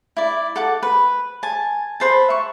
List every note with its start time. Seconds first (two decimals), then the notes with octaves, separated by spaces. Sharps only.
0.17 E4 D5
0.56 A4 F#5 D6
0.83 B4
1.43 G#5 A5
2.00 B4 C5 A5
2.28 E5 C#6